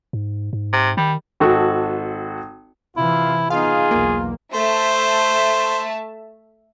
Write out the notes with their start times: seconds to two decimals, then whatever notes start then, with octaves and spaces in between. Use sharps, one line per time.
0.13 G#2
0.53 G#2
0.73 C3
0.97 D#3 G3
1.40 G#1 F#4 A4 F#5
2.97 C3 E3 E4 F4
3.50 B3 D#4 F4 G#4 F5
3.91 B1 E2 A#3
4.54 A3 C5 E5 A5